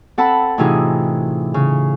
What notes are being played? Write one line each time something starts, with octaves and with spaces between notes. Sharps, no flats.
C4 A4 F#5 A5 B5
A2 C3 E3 D#4 F4 G#4
C#3